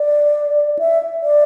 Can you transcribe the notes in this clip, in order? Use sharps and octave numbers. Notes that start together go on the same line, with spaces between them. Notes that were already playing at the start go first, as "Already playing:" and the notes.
Already playing: D5
E5
D5